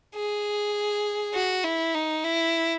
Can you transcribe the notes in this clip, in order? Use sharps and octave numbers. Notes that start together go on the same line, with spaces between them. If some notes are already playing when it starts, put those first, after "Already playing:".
G#4
F#4
E4
D#4
E4